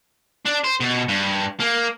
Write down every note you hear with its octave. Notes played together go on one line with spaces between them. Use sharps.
D4
C5
B2
G2
A#3